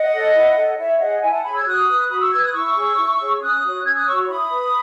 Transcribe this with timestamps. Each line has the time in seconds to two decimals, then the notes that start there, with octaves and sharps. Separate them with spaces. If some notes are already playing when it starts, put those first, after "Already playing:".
Already playing: D#5 F#5
0.12 A4 C#5
0.34 E4
0.56 A4 C#5
0.78 E4 C#5 E5
0.99 G#4 C#5 D#5 F#5
1.21 E4 E5 G#5
1.32 F#5 A5
1.43 G#4 C#5 G#5 B5
1.54 E6 G#6
1.65 F#4 D#6 F#6
1.87 B4
2.09 F#4 B5 D#6
2.19 C#6 E6
2.31 B4 E6 G#6
2.43 D#6 F#6
2.52 E4 C#6 E6
2.75 G#4 C#5
2.96 E4
3.19 G#4 C#5
3.40 C#4 D#6 F#6
3.62 F#4 C#5
3.84 C#4 E6 G#6
3.95 D#6 F#6
4.06 F#4 C#5 C#6 E6
4.24 C#6
4.28 E4 B5 D#6
4.50 B4